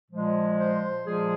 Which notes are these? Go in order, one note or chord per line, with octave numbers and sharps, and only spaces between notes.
A#2 F3 G#3
C5
A#2 F3 G#3 G#4